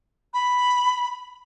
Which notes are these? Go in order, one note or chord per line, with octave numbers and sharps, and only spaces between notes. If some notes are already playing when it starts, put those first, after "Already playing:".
B5